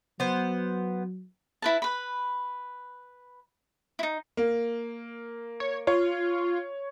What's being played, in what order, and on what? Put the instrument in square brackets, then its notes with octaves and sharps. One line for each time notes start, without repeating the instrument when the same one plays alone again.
[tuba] F#3 [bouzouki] B3 C5
[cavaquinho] E4 B4 A5
B4 B5
D#4 E4
[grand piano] A#3
[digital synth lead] C#5
[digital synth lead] F4 [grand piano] C#5